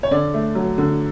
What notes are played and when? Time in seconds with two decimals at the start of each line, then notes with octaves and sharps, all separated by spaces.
0.03 C#5
0.11 D3 D5
0.34 A3
0.55 F#3
0.78 D3